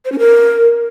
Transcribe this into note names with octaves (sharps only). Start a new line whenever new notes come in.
C5
C#4
A#4